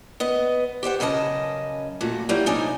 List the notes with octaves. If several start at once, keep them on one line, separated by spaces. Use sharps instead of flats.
B3 D#5
G4 C5 D5 F#5
F#2 C#3 C#4 D#5 A5
A#2 F3 A3 F#4
F#3 G3 A3 A#3 E4
C3 D4 D#4 C#5 G#5